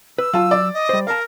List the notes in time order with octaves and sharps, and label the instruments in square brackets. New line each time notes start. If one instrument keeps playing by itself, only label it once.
[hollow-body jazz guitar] B4 [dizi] E6
[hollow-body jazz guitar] F#3 A5 [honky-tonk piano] F4
[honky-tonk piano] D5
[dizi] D#5
[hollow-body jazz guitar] G3 C5
[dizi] A#4 [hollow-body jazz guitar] F5 A5